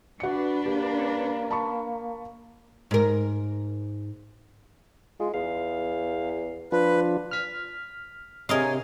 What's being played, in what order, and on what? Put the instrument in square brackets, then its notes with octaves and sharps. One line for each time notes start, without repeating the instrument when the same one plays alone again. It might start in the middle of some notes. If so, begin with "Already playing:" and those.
[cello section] D4 B4 [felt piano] F#4 C#7
[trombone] A#3 [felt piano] G4
[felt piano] A5 B5 C#6
[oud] G#2 A#4
[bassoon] G#3 [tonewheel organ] F4
[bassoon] E2 [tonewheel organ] F5
[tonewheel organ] F3 D4 F4 [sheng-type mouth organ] B4
[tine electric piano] F6 B6
[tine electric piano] C3 [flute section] G#4 C#5 G#5 [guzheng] A#4 D#5 F5